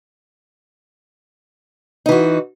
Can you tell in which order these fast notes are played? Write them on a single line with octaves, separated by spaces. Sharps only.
D#4 E3 F#4